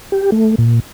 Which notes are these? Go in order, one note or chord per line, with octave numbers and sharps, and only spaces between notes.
G4
A3
A#2